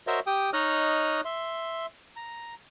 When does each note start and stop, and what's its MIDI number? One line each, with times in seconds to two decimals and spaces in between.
0.07 0.20 66
0.07 0.20 70
0.07 0.20 72
0.07 0.20 73
0.07 0.20 75
0.07 0.20 76
0.27 0.50 67
0.27 0.50 79
0.27 0.50 87
0.53 1.21 63
0.53 1.21 73
0.53 1.21 75
0.53 1.21 87
0.53 1.21 89
0.53 1.21 90
1.25 1.86 76
1.25 1.86 84
2.16 2.55 82